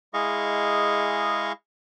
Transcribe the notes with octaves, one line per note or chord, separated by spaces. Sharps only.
G#3 E4 G#4 D#5 F5 C#6